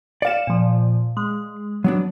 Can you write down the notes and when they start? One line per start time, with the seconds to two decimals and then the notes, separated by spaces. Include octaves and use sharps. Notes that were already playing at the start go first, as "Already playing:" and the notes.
0.22 D5 F5 C#7 E7
0.47 A#2 F3
1.17 G#3
1.84 F#3 B3 D4